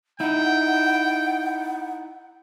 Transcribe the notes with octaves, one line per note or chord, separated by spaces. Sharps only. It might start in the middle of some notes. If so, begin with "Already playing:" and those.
D#4 E4 F#5 G5